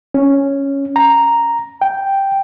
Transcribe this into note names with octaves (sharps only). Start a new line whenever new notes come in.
C#4
A#5
G5